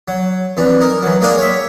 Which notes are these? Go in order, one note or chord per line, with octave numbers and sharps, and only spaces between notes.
F#3
F2 E3 D4
D#4 A#4
E3 F#3
G#3 A#3 D4 D#4 F5 G5
C#5 E5